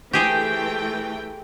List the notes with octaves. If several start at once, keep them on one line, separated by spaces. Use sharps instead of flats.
E3 A3 G4 G#4 C5 G5